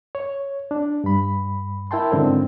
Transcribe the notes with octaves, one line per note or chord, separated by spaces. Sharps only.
C#5
D4
G2 B5
E4 A#4 G5 A5 C6
G#2 D3 D#3 F#3 C4 C#4